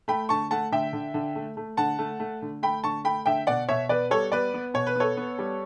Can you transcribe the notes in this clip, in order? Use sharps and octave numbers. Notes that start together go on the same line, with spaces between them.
A3 G5 B5
D3 A5 C#6
A3 F#5 A5
D3 E5 G5
D3
D3
A3
A3
D3 F#5 A5
A3
A3
D3
A3 G5 B5
D3 A5 C#6
A3 G5 B5
D3 E5 G5
B2 D5 F#5
B2 C#5 E5
B3 B4 D5
G3 A4 C#5
B3 B4 D5
B3
B2 C#5
B4
B3 A4 C#5
B3
G3